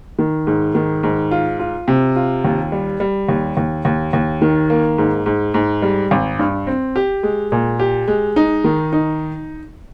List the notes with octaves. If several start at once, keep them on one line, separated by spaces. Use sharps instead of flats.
D#3
G#2
D#3
G#2
F4
F4
C3
F4
D#2
G3
G3
D#2
D#2
D#2
D#2
D#3
A#3
G#2
G#2
G#2
G3
G#1
G2
C4
G4
G#3
A#2
G4
G#3
D#4
D#3
D#4